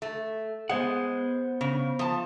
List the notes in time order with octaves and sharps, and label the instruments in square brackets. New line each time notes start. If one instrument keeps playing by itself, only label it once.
[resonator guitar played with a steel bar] A3
[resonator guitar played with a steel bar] G#3 [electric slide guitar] B3 C5 F#5
[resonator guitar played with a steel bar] C#3
F3 A5